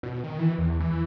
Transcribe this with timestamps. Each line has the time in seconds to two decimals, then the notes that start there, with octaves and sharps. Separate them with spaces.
0.03 B2
0.24 D#3
0.39 E3
0.58 E2
0.80 E3